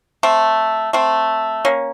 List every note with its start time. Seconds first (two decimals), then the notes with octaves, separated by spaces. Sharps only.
0.23 A3 C4
0.93 A3 C4
1.65 A#3 C#4